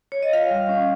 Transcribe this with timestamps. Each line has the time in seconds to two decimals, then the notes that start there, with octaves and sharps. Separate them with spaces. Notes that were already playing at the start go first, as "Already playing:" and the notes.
0.12 C#5
0.23 D#5
0.33 F4 F5
0.51 G3
0.69 C#4